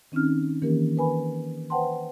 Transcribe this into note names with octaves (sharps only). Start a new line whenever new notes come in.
D#3 C4 C#4 D#4 F6
D#3 E3 A#3 C#4 G4 A#4
A#4 B4 G#5 B5
B4 C5 F#5 G5 A5 C6